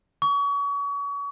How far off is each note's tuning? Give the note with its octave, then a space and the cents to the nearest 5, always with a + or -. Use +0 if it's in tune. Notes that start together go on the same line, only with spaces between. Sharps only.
C#6 +35